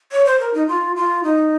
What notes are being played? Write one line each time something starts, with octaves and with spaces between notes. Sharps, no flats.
C#5
C5
A#4
D#4
F4
F4
D#4